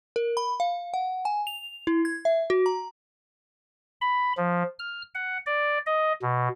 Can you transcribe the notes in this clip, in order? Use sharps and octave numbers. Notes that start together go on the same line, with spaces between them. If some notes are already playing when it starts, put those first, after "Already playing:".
A#4
B5
F5
F#5
G#5
F7
E4
G#6
E5
F#4
A#5
B5
F3
F6
F#5
D5
D#5
B2